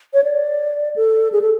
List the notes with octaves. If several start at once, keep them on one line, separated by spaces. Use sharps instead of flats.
C#5
D5
A4
G#4
A4